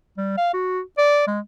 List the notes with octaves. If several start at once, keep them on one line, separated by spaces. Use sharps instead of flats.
G3
F5
F#4
D5
G#3